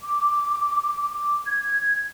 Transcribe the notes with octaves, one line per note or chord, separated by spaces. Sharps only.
D6
D6
G#6